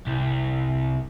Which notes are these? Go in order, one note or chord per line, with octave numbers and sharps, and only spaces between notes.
C2